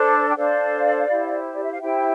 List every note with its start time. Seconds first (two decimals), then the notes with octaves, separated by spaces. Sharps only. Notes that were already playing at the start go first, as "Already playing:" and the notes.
Already playing: D4 A4 C5
0.28 G5
0.36 D4 A4 C5 D5 F5
1.08 E4 G4 C5
1.53 D5
1.63 E5
1.72 F5
1.80 E4 G4 C5 E5 G5